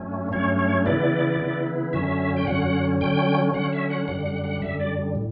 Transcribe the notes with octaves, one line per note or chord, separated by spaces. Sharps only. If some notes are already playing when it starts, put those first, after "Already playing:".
Already playing: G2 F#3 A3 C#4
G2 F#3 A3 C#4 C#5
C#5
C#3 E3 B3 E4 D5
C#3 E3 B3 E4
F#2 D3 F#3 C#4 E5
G5
F#2 D3 F#3 C#4 F#5
D3 F#3 C#4 G5
D3 F#3 C#4 F#5
E5
F#5
F#2 D3 G3 F#5
F#5
F#5
F#2 D3 G3 E5
D5
A2